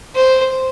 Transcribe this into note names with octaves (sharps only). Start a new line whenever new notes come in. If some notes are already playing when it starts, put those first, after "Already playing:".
C5